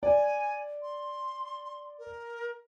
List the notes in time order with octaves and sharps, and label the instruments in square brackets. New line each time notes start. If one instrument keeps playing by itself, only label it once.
[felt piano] D5 [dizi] G#5
[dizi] C6
A#4